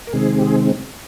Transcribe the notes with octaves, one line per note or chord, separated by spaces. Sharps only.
A#4
C3 D#3 G#3 C4 G#4
G4
G#4